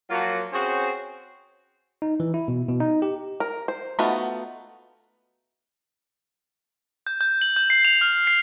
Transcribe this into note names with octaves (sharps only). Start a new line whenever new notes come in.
F3 F#3 A#3 F4 F#4
C4 C#4 F#4 G#4 C5
D#4
E3
E4
B2
B2
D#4
G4
A#4
C5
A3 B3 D#4 F4 F#4
G6
G6
F#7
G6
C7
F7
F6
C7